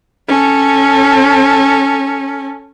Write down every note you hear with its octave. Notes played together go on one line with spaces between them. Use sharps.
C#4 A4